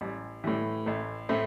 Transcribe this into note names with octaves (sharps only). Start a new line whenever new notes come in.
A1 G3
A2 E3 G3
A1 A3
A2 A3 C4